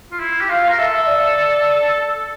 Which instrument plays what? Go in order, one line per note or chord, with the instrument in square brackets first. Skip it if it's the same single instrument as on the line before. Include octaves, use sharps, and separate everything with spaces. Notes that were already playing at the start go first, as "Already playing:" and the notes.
[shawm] F4
E4
G4
[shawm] F4 [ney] F5
[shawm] A#4
[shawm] A4 [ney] E5
[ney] E5
D5